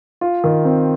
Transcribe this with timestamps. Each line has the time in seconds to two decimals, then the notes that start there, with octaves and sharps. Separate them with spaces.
0.21 F4
0.44 D#3
0.65 C4